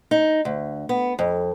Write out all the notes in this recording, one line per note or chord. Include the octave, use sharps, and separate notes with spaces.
D#4
D2
B3
F2